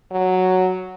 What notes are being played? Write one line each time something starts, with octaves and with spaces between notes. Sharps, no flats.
F#3